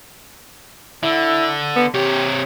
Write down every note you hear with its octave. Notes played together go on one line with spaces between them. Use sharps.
D3 E4
B3
C3 G4 C#5